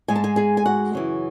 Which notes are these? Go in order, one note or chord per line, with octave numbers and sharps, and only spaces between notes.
G#2 G#3 G#5
A5
G#4 G#5
G#4 G#5
G#5
F#4 F#5
F#2 C#3 E3